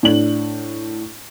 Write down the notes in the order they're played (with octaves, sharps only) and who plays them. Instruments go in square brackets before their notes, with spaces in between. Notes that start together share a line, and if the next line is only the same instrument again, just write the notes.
[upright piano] A2 D4 F#7